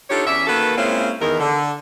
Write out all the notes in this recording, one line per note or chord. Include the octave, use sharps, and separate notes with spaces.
D4 D#4 F4 G4 A4 C#5
E2 C#4 D5 E5
D#3 A#3 F#4 A4 B4
G#3 A#3 C4 C#4 E4 F4
E2 D#3 A#4
D3